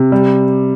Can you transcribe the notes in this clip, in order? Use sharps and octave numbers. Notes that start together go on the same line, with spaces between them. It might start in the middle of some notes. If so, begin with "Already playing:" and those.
Already playing: C3
G3